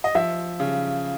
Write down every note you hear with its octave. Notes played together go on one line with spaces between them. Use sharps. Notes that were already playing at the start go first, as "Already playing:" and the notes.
D#5
F3 E5
C#3